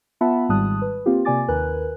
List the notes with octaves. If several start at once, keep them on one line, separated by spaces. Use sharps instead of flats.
B3 F4 E5 F#5 A5 B5
G#1 G#2 G3 A5 D#6 F#6
B4
A#3 C4 F4 G4
C3 A#3 D5 G#5 D6 A6
D#2 A#4 B4 G#5 F#6